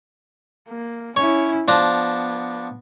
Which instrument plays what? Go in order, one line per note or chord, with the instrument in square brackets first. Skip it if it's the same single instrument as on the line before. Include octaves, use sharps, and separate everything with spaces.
[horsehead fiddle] A#3
[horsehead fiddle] C#4 E4 [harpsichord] C#5
[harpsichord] F3 D4 A#5 [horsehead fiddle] B3